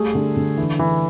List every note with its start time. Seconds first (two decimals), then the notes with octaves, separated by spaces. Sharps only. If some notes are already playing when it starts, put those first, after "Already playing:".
Already playing: G3 A3 G#4
0.15 D3
0.37 D3
0.58 E3
0.79 E3